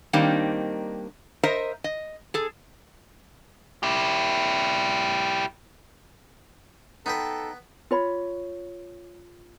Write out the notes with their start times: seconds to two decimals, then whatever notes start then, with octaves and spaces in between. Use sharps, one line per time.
0.13 D#3 G3 A#3 C4 D4 D#4
1.43 A#4 C5 D#5 E5 A#5
1.84 D#5
2.34 G#4 A4
3.83 E4 G4
7.06 B3 D#4 A4 B4 G5
7.91 F4 C#5 B5